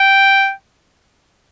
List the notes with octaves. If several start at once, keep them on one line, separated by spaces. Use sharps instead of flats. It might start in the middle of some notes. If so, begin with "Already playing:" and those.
Already playing: G5